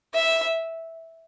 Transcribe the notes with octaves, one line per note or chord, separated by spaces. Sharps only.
E5